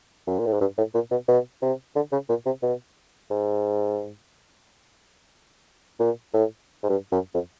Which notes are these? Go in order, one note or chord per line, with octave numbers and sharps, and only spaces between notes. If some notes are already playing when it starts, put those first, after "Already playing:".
F#2
A#2
A2
G#2
G2
A2
A#2
B2
B2
C3
D3
C#3
A#2
C3
B2
G#2
A#2
A2
G#2
G2
F#2
F2